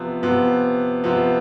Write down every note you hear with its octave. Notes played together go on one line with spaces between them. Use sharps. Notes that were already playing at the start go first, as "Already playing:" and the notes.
Already playing: C3 F3 B3
C3 F3 B3
C3 F3 B3